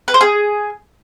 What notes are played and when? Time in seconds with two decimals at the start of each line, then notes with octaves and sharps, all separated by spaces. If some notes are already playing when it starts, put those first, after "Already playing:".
0.08 B4
0.14 C5
0.21 G#4